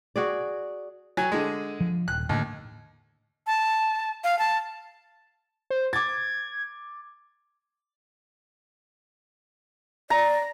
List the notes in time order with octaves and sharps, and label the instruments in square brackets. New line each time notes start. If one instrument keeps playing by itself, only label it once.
[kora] F#4 G#4 D5
[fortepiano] F#3 G#5
D3 G#3
[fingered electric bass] F3
[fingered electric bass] D#1 [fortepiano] F#6
[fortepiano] D#2 [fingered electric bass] A2 D3 A3
[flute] A5
F5
A5
[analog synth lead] C5
[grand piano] D6 A6 [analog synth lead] G#6
[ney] D5 [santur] A#5